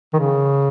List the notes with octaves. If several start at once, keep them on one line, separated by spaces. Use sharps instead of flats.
D#3
C#3